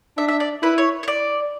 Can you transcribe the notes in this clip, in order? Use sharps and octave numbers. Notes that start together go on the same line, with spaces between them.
D4 E5
E5
D5
E4 B4
C#5
C#5
D5